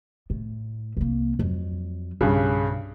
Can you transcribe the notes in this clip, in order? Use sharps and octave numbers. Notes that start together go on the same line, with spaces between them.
A2
C2 A#3
F2 F#3
B1 G2 C#3